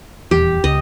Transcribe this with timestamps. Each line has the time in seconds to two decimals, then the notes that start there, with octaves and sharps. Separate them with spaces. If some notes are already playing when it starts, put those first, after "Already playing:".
0.31 D#1 E2 G4
0.64 C#2 D#5